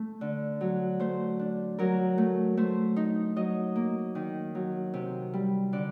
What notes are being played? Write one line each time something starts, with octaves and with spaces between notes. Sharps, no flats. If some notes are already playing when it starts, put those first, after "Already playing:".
Already playing: A3
D3
F#3
A3 C5
D4
F#3 A#4
A3
A3 C5
D#4
F#3 D#5
A#3
D#3
F#3
C3
G3
D3 D5